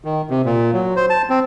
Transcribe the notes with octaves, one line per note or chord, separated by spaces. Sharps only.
D#3
C3
A#2
F#3
C5
A5
C4